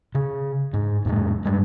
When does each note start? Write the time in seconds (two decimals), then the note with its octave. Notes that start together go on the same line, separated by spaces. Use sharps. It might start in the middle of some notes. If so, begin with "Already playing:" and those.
0.15 C#3
0.73 G#2
1.05 F2 A2 G#3
1.45 G2 G3 G#3